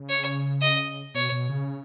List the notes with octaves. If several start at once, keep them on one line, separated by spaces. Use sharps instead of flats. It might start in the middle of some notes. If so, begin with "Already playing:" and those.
Already playing: C#3
C#5
D#5
B2 C#5
B2
C#3